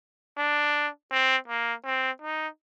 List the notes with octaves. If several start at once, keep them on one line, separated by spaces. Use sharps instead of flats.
D4
C4
A#3
C4
D#4